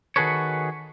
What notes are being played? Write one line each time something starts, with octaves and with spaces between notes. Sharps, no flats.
D#3 F#4 G#4 A4 B4 C#5